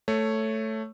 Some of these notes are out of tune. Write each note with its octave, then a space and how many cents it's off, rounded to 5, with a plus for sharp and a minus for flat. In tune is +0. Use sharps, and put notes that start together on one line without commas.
A3 +5 C#5 +0